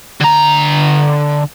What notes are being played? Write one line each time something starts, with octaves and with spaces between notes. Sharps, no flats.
D3 A#5